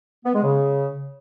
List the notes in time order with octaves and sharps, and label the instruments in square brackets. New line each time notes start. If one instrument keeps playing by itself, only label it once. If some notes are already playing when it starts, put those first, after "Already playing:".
[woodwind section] B3
G#3
C#3